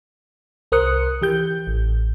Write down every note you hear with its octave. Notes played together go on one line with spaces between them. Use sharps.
C2 A#4 C5 D#6 F#6 C#7
E3 G4 G6
A1